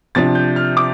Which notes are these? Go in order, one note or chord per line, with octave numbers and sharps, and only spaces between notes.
C3 F3 D4 A6
G6
F6
D6